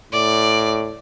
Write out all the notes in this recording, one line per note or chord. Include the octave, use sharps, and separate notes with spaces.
A2 D5